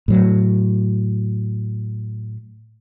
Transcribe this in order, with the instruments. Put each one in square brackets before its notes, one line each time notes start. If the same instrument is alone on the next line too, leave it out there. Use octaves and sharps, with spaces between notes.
[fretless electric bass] A2 F#3